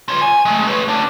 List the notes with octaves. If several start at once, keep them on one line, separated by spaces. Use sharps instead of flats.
F4 C#5
G#5
G#3 A3
B4 C#5
A3 D4